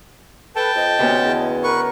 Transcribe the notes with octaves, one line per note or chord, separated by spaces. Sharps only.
A4 B4 G5 A5
F2 D#5
D2 C3 B3 C#4
E2
A#4 B4 C#6